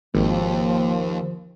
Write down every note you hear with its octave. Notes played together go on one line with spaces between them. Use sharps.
G#1 D#2 F3 A#3